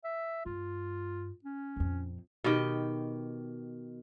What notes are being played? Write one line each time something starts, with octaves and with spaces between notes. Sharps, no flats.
E5
G2 F4
C#4
A#1 F2
B2 D#3 G4 G5